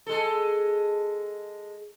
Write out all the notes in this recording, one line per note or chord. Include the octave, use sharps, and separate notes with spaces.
G#3 A4